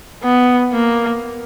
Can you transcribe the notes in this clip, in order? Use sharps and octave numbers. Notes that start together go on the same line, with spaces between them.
B3
A#3